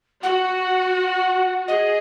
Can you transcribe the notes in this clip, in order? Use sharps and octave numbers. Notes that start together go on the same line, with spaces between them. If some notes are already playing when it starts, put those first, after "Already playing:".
F#4 F#5
G#4 D#5